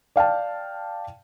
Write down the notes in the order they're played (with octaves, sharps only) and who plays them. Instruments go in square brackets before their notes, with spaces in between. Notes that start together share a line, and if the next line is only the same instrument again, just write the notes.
[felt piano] D5 F5 G5 A5